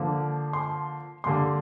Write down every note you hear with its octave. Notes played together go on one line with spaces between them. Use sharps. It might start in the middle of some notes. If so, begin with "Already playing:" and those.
Already playing: D3 F3 A#3
C6
D3 G3 A#3 C6